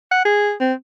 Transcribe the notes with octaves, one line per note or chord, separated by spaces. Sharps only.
F#5
G#4
C4